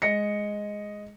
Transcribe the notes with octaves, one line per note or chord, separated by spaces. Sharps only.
G#3 D#5 A#6 C#7